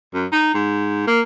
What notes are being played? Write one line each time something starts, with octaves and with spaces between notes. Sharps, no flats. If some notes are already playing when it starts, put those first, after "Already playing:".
F#2
D#4
G#2
A#3